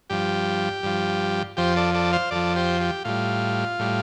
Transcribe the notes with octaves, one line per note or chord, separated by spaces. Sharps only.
G2 F3 G4
G2 F3
F2 F3 G4 C5
A4 D5
A4 D5
C5 F5
F2 F3 A4 D5
G4 C5
G4
A2 G3 F4
A2 G3